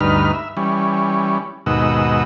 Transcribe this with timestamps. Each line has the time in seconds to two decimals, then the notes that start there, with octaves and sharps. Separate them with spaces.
0.01 D2 G2 D#4 B4 F6
0.33 E5
0.57 E3 G3 C#4
1.66 D#2 G#2 B2 D#5 F#5 E6